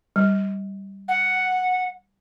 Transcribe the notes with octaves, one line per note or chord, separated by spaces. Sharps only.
G3
F#5